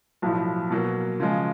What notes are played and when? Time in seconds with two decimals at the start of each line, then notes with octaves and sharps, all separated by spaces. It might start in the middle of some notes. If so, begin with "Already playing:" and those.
0.22 B1 A2 F3
0.70 B2 F#3 A#3
1.20 C#3 F3 G#3